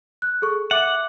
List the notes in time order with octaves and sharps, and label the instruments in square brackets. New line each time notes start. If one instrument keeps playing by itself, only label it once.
[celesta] F#6
G#4 A4 C#6
[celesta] E5 D6 F#6 [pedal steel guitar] F#5